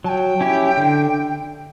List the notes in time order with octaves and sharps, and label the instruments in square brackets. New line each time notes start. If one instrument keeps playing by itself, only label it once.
[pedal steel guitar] F#3 [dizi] A5
[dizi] G5
[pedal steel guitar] C#4 E4 G4
D3